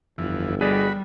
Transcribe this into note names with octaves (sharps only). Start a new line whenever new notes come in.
G1 F2 E3
G3 F#4 G#4 D5 D#5 B5